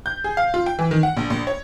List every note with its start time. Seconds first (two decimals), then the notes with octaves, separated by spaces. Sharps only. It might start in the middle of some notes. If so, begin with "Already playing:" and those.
0.06 G6
0.24 G#4
0.37 F5
0.54 F4
0.66 G5
0.79 E3
0.91 D#3
1.03 F#5
1.17 A#1
1.30 A#1
1.47 C#5